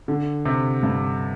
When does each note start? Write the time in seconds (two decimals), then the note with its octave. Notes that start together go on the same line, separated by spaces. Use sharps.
0.08 D3
0.46 C3
0.83 G2